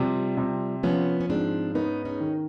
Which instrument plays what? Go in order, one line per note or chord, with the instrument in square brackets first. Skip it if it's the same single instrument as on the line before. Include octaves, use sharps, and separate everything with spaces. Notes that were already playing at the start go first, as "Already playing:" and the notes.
Already playing: [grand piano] C3 [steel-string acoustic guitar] F3 G3
[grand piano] C3
[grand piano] F3 [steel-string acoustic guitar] B3 C#4
[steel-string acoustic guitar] C#4
[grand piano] G#2 [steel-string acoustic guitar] C4 D4
[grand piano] B3 [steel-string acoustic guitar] C#4 D#4
[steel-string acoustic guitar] C#4 D#4
[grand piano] D#3